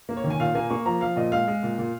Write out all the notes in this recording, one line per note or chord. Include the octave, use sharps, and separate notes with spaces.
A#3
C#5
D#3
G#5
A#2 F5
A#3 G#5
A#3 C#6
F3 A#5
F3 F5
A#2 D#5
G#3 F5
G#3
A#2
A#2